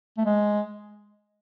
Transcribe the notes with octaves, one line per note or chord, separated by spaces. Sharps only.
A3
G#3